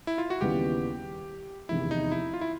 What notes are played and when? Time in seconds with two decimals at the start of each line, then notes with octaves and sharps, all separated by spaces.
0.07 E4
0.18 F4
0.30 F#4
0.41 D#2 C#3 E3 G3 B3 G4
1.69 F1 E2 C3 D#3 E4
1.91 D#4
2.12 E4
2.34 F4
2.41 E4